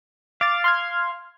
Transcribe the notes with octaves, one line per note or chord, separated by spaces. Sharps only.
F5 D6 A6
C6 F6 G#6